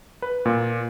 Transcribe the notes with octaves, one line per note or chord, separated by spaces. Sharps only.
B4
A#2